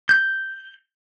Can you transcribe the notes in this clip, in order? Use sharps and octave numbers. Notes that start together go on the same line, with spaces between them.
G6